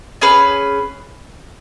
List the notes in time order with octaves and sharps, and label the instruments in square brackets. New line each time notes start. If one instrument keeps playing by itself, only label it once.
[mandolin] C#4 G#4 B4